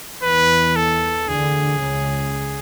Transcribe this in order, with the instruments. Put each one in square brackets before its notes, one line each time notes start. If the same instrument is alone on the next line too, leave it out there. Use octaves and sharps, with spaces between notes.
[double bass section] E2 E3 [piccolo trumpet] B4
[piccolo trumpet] A4
[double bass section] D2 D3 [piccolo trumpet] G#4
[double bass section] C#2 C#3